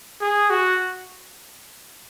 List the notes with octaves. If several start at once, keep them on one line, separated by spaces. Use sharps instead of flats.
G#4
F#4